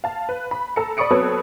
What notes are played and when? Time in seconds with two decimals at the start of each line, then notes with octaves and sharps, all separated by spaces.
0.04 F5 A5
0.29 B4
0.51 B5
0.76 A4 A#5 C#7
0.97 D5 B5 C#6 D#6 C#7 D7
1.11 F#3 B3 C4 A4 B4 C#5